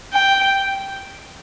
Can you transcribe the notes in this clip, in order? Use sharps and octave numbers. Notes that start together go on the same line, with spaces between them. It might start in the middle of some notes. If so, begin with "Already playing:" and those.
G5